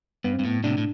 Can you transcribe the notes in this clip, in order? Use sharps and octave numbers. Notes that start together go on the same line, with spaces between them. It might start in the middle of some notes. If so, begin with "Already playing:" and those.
G2 B3
C4
G2
A2 B3
A2 C3 D4
A2